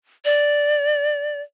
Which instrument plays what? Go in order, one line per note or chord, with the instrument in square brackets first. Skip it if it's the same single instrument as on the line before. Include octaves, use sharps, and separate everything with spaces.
[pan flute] D5